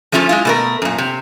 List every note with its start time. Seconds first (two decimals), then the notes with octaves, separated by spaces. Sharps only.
0.12 F3 A3 C#4 F4 G4 A4
0.29 G#3 E4 F4
0.45 B2 A3 A#4
0.82 F#2 A#2
0.98 C3